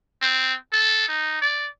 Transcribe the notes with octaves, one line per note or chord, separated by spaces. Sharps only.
C4
A4
D#4
D5